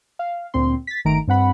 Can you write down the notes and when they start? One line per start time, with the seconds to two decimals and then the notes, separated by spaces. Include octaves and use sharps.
0.19 F5
0.54 D2 A#2 C4 C6
0.87 A6 B6
1.05 G1 D#3 A3 A#5 D7
1.28 G2 C4 F#5 B5